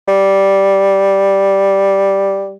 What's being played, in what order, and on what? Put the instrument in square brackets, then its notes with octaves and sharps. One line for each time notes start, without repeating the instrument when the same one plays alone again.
[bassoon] G3